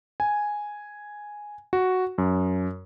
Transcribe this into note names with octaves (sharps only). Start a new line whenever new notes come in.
G#5
F#4
F#2